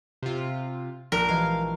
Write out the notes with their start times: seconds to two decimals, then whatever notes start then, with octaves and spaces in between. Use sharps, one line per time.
0.23 C3 F4
1.12 A#1 A#4 G5 F#6
1.29 E3 G#3 G4 F5